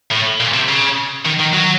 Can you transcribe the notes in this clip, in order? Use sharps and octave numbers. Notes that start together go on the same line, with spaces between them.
A2
A#2
C3
C#3
D#3
D#3
F#3